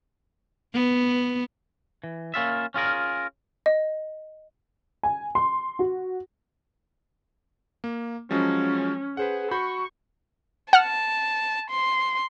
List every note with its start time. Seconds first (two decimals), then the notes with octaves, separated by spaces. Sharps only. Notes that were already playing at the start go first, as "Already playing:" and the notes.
0.74 B3
2.04 E3
2.34 A#3 C#4 F4 E5
2.74 C#4 F4 G#4 A#4
3.66 D#5
5.03 G#5
5.35 C6
5.79 F#4
7.84 A#3
8.31 F3 F#3 G#3 C#4
9.17 G#4 B4 C5 F#5
9.51 F#4 B5 C#6 G6
10.73 F#5 A5 F6
11.71 C6